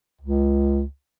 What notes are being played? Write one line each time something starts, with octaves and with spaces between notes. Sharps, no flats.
C#2